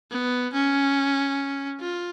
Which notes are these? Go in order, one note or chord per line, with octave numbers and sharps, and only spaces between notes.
B3
C#4
F4